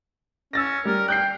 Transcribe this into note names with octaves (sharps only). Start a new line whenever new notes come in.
C#4 E6 A6 A#6
G3 A#4
G5 F#6 G6 C7